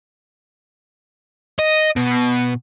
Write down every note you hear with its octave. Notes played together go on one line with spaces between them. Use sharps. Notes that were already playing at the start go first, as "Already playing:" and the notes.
D#5
B2